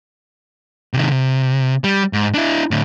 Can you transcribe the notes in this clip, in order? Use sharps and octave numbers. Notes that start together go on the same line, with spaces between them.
C3 D#3
C3
G3
G#2
D4 E4
A2 D3